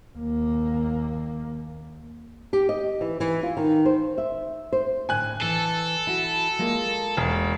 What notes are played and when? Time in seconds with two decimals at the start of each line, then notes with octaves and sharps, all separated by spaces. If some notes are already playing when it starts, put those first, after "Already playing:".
0.16 D#2 A#3
2.53 G4
2.69 D#5
3.01 E3
3.20 E3
3.43 F4
3.57 D#3
3.85 C5
4.18 E5
4.72 C5
5.09 A2 D3 G#5 F#6
5.42 E3 A4
6.07 E4 F#4
6.59 G#3 A#3 F4
7.17 E1